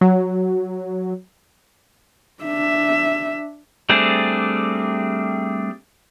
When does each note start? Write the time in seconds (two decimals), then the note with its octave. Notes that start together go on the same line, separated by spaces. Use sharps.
0.01 F#3
2.43 D4 E5
3.89 G3 A3 C4 D4 G#4